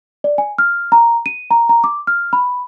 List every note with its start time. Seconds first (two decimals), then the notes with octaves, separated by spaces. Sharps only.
0.24 D5
0.38 G#5
0.58 F6
0.92 A#5
1.26 D#7
1.51 A#5
1.69 A#5
1.84 D6
2.07 F6
2.33 B5